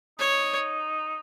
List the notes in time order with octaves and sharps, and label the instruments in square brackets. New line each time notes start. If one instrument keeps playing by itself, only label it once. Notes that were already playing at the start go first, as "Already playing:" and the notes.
[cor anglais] D#4 [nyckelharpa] C#5